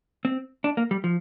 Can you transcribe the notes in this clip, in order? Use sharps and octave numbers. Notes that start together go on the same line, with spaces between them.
C4
D4
A#3
G3
F3